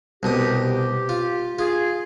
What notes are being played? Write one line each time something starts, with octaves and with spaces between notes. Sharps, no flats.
C2 B2 G4 D#6
F4
F4 G#4